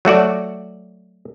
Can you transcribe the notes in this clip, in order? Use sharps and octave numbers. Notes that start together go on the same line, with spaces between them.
F#3 A3 F#4 D5